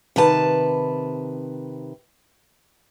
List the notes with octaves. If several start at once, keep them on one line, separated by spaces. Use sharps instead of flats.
C3 D#3 B4 A5